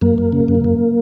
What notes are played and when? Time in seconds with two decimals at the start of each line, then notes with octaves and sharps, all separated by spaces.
0.01 F#2 A#3
0.18 F#2
0.32 C#3
0.48 F#2
0.64 F#2